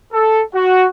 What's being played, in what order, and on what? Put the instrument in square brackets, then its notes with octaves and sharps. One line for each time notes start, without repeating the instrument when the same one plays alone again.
[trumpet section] A4
F#4